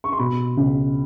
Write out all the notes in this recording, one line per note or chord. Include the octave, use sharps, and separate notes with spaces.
C#6
C6
B2 B5
C#2